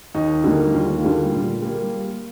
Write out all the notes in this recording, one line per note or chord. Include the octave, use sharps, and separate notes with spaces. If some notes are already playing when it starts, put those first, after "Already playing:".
D#2 D#4
D3 G3 A#3
D#2 F4
D3 G3 A#3
A#2
G3 A#3